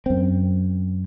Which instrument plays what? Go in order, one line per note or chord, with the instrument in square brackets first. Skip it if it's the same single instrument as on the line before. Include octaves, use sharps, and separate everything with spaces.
[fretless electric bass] F#2 C4